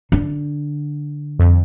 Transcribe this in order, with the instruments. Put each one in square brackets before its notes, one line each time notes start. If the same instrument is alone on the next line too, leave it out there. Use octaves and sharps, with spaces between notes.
[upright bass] D3
[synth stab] F2